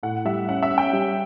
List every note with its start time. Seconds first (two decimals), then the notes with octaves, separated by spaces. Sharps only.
0.03 A2 F#5
0.25 G3 E5
0.48 C#4 F#5
0.63 E5
0.71 C#4
0.78 G5
0.93 G3